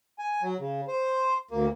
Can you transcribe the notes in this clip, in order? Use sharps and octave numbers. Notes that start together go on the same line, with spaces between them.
G#5
F#3
C#3
C5
D2 A#3